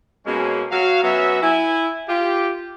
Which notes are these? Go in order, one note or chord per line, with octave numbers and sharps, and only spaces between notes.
B2 G#3 A#3 C#4
F#3 F5
F#3 B3 C#4 E5
E4 G#5
F4 G4